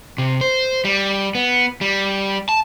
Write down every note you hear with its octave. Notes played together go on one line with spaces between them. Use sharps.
C3
C5
G3
B3
G3
A5